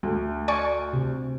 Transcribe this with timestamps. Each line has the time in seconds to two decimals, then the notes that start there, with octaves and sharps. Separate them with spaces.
0.03 D2 A3
0.48 D5 G#5 C#6
0.93 C3